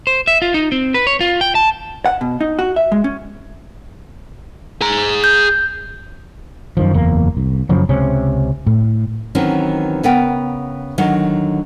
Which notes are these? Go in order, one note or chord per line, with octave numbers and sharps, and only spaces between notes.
C5
E5
F4
D#4
C4
B4
C#5
F4
G5
A5
F#5
B2
D#4
F#4
E5
G#3
C#4
G#4 A#5
G6
F#2 D#3 F3
F#1 E2 A#3
C2
F#2 C#3 F3 F#3
C#2 C3 C#4
A2
D#3 E3 F#3 C4 C#4
C#3 B3 A#4 G5
D3 D#3 F#3